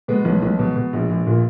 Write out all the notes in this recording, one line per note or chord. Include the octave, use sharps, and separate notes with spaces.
B2 G#3 B3
B1
B1
B2
B2
A#1
A#1
A#2